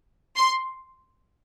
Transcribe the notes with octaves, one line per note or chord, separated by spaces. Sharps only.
C6